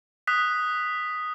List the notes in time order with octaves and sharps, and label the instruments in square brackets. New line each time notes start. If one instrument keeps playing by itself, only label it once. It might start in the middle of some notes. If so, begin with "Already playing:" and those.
[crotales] D#6 F#6 B6